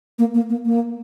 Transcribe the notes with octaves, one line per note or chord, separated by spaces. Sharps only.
A#3
A#3
A#3
A#3